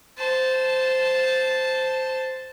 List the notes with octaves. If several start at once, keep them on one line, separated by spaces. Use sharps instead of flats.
C5 A5